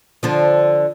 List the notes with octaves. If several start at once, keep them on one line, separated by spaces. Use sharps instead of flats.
D3 F3